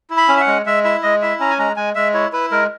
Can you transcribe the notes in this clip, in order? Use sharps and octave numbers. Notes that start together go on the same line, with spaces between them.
E4
B5
C#4
E5
F#5
G#3
G#3 E5
E4 E5
G#3 D#5
E4 E5
C#4 A#5
G#5
G#3 A#5
G#3 G#5
G#3 E5
E4 C#5
E4 B4
G#3 A#4